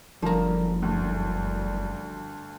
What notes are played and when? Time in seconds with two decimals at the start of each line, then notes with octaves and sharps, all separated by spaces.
0.22 F#1 D3 F3 G3 A#3 A#4 A#5
0.82 D2 G2 G3